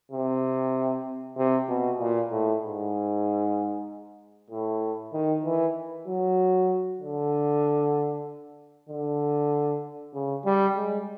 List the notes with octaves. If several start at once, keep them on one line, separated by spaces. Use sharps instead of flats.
C3
C3
B2
A#2
A2
G#2
A2
D#3
E3
F#3
D3
D3
C#3
G3
G#3